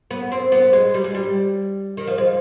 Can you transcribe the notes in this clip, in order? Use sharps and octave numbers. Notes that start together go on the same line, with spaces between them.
B3
C4
B3
G#3
G3
G#3
G3
D#3
F3
G#3